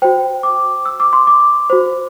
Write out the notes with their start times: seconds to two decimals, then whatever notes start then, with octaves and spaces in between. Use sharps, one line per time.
0.02 F#4 C5 G5
0.43 D6
0.86 E6
1.00 D6
1.13 C6
1.27 D6
1.70 F#4 C5